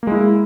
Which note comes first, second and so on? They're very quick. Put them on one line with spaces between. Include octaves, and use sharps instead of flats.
A#3 G#3 E4